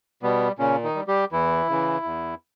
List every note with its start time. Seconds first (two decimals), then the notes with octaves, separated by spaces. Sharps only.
0.23 B2 G3 B3
0.59 A#2 C#3 C#4
0.83 D#3 D#4
0.95 G3
1.07 G3 G4
1.32 E2 E3 E4
1.69 C#3 E3
2.05 E2